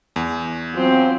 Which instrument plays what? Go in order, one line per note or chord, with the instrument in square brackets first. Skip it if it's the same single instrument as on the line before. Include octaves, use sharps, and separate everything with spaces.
[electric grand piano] E2
[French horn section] F#3 F4 [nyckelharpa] C4